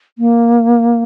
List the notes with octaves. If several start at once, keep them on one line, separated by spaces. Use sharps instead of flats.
A#3